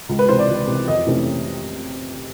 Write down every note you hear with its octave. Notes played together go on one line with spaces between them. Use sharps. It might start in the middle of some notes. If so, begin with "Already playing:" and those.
C#2
B4
C3 E3 C5
D5
C#2
C3 E3
F2 D#5
C3 E3 A3 C#4